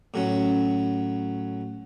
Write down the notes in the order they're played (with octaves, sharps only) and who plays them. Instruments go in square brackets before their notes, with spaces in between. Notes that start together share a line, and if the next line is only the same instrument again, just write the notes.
[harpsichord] A2 F#3 C#4